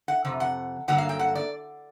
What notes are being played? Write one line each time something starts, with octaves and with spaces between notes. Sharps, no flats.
F#5
F2 C3
F#5
G2 D3 F#3 A#3 F#5
F5
G5
F#5
D5